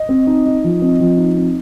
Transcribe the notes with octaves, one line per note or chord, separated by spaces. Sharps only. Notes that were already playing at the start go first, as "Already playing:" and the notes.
Already playing: D#5
C4
D#4
D#4
F3
C4
F3
D#4
C4